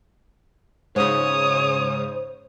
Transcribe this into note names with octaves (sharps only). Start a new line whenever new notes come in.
G#2 C#3 C5 C#5 D#6